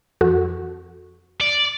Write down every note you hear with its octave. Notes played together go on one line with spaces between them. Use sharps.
F2 F#4 A4
D5